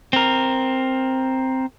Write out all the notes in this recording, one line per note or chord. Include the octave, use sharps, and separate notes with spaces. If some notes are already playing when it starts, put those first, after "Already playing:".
C4 A#4